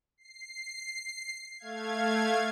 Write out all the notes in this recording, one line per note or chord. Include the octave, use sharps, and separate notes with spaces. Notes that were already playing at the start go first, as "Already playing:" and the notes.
C7
A3 F5 G#6